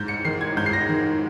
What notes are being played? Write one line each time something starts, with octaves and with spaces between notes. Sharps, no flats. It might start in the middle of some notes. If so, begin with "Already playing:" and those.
Already playing: G#2 G6
C#7
D#3 C7
G#6
G#2 G6
C7
A#6
D#3